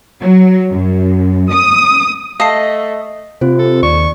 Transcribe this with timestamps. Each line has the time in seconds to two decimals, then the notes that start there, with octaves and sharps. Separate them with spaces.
0.20 F#3
0.70 F#2
1.50 D#6
2.40 A3 D#5 F5 A5 C7
3.41 C3 C4 F4 C5
3.59 A4
3.83 D#2 D5 C#6